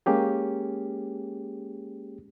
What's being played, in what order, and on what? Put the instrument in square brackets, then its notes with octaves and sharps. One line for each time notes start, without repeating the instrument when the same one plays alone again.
[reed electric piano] G#3 A#3 C#4 G4 G#4